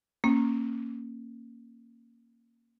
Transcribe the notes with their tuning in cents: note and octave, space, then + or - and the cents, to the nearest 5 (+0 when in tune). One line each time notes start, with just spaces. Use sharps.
A#3 -10 C#4 -20